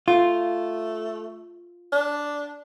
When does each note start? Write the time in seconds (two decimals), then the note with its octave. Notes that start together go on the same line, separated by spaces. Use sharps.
0.08 A3 F4
1.92 D4